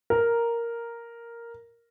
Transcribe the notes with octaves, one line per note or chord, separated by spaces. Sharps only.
A#4 A#5